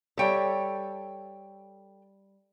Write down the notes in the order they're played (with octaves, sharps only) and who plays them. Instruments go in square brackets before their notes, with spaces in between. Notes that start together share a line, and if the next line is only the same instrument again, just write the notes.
[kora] G3 C#5 E5 [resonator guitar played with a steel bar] A4 G5